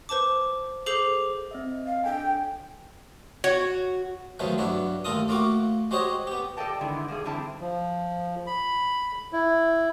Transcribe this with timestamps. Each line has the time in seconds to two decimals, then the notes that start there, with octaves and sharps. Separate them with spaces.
0.09 B4 C5 A5 D6
0.86 G#4 A4 C5 D6 C7 F7
1.51 C4 D#5 E5
1.86 F5
2.04 D4 A4 G5 G#5
3.44 F#4 C#5
4.39 D#3 F3 F#3 G#3 A3 B3
4.58 G2 F#3 B3 D4 E4
5.04 D#2 A2 F4 A4 A#4 D#6
5.28 A2 A#3 F4 F#4 C#6 D6
5.91 G#3 F#4 G4 C5 C#5 D#5
6.27 B3 G4
6.57 G4 A4 D5 D#5 G5 A5
6.81 D3 D#3 G#3 B3 E4
7.08 G2 B2 G3 G#4
7.25 D3 E3 G3 C4 E4 A5
7.61 F3
8.47 B5
9.33 E4